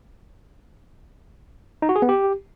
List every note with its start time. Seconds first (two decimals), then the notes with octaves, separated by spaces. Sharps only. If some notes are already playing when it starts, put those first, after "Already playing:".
1.82 D#4
1.89 F#4
1.96 G#4
2.02 B3
2.09 G4